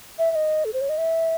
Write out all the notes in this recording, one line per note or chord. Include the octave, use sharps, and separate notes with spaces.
E5
E5
D#5
A4
C5
C#5
D#5
E5